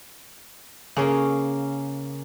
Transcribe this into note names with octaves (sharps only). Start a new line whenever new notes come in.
C#3 A#3 C#4